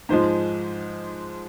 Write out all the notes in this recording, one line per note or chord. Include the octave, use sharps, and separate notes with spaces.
G#2 F3 G#3 C5